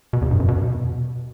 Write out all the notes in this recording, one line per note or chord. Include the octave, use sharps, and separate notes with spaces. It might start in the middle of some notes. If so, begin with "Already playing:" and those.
B2
E2
G2
F#2
B2